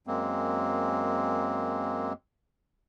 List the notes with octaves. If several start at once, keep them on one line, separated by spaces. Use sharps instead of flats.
F#2 G#3 A#3 C4